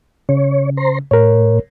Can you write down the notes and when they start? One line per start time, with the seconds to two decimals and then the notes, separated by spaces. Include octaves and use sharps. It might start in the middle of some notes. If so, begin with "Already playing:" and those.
0.29 C#3 C#5
0.77 C5 A#5 C6
1.11 A2 A#4 C#5